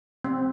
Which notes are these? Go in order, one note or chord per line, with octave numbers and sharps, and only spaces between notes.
C4